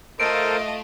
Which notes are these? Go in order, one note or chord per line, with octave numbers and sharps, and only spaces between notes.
A3 F4 A4 A#4 C5 D#5 D7